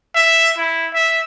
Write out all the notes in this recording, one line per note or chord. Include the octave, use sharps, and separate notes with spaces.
E5
E4
E5